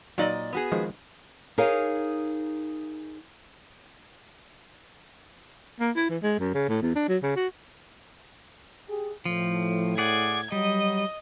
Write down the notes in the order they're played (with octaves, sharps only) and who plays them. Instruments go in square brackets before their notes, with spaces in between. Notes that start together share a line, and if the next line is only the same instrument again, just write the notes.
[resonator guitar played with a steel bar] A#2 D5 D#5 [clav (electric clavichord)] F#3 D#4
[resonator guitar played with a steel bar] B3 F#4 G#4
[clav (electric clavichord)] D#3 F3 G#3
[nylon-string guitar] D#4 G#4 A#4 C#5 F5
[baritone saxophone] A#3
E4
E3
G#3
F#2
C#3
A2
E2
D4
F#3
C#3
F#4
[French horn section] G4 G#4
[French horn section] A2 [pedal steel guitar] F3
[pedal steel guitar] G#4 D5 F#5 [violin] G#6
[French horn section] F#3 [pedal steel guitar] G3 [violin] D#5